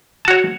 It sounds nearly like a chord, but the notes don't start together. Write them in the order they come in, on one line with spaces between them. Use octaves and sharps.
A5 F#4 C#5